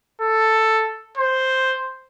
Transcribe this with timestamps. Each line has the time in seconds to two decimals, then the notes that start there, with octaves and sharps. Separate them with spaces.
0.22 A4
1.18 C5